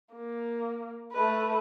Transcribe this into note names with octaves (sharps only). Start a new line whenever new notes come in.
A#3
A3 B4